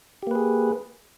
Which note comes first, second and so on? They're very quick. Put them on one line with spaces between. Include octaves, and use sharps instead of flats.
G4 A#3 B4 G#4